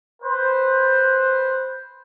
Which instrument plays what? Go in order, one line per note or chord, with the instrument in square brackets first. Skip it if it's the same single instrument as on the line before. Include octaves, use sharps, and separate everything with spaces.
[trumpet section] B4 C5